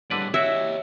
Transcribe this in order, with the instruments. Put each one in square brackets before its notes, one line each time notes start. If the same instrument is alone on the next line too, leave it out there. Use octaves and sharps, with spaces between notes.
[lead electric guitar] A2 G3 [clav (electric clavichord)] D3 B4 D5
[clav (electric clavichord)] E4 F#4 [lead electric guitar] G4 C#5 [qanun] E5